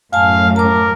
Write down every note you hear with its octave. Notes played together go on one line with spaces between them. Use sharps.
F#2 A2 F5 G#5 A5
A#4 A5 D6